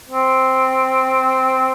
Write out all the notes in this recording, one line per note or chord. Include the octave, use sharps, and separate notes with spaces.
C4